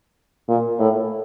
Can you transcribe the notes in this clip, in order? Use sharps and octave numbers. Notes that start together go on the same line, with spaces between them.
A#2
A2